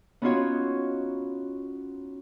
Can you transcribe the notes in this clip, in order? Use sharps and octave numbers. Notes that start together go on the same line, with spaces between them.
B3 C#4 D#4 F4 F#4 C#5